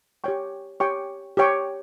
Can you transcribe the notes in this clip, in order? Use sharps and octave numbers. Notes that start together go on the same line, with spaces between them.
G4 C#5 G5 C#6
G4 C#5 G5 C#6
G4 C#5 G5 C#6